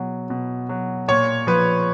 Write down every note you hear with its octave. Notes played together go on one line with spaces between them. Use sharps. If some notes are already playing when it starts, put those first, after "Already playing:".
Already playing: B2 F#3
B2
F#3
A#2 C#5
F3 B4